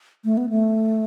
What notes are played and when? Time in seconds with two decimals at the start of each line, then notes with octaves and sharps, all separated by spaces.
0.24 A3
0.37 B3
0.49 A3